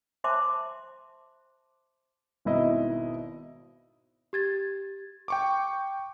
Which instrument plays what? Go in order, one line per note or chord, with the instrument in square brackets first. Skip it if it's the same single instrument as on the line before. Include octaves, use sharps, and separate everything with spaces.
[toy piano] C5 E5 A5 C6 D6
[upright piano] G#1 B2 D#4 E4 D#5
[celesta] G4 G#6 A6
[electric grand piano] G5 C#6 D6